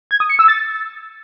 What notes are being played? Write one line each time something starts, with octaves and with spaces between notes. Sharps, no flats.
G#6
D#6
C#7
E6
A6